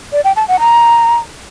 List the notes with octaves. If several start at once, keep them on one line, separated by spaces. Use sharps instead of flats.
D5
G5
A5
F#5
A#5